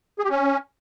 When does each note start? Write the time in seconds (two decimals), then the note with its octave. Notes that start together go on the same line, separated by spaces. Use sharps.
0.19 G#4
0.24 G4
0.29 C#4